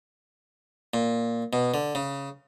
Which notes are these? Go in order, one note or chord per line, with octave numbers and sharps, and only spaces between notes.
A#2
B2
D3
C#3